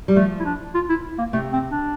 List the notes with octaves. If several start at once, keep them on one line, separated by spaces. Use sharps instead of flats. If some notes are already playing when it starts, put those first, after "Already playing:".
G3
F3 A3
E4
D4
F4
E4
A#3
C3 A3
C4
D4